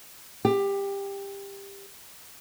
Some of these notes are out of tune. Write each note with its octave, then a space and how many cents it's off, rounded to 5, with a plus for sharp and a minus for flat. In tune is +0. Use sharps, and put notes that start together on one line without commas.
G4 +20